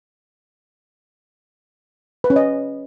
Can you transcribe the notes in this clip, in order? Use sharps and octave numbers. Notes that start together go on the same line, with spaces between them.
B4
C#4
D#5